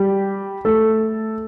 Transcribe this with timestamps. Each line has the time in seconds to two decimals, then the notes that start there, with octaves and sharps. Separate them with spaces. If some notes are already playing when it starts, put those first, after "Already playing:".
Already playing: G3 G4
0.65 A3 A4